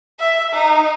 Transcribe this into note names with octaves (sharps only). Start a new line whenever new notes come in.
E5
D#4